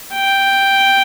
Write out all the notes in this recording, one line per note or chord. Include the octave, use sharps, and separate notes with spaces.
G5